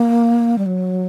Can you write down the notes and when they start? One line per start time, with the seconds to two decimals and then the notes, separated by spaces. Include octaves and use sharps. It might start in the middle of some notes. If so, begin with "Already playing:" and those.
Already playing: A#3
0.58 G3
0.66 F#3